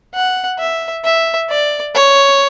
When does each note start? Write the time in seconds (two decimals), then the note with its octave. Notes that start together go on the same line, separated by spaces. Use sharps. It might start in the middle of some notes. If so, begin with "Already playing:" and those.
0.14 F#5
0.59 E5
1.04 E5
1.49 D5
1.95 C#5